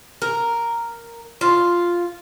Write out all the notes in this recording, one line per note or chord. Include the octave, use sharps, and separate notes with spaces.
A#4
F4